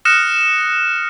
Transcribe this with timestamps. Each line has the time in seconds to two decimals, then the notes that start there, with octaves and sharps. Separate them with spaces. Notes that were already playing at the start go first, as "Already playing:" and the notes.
0.05 D#6 F6 F#6 A#6 C#7 E7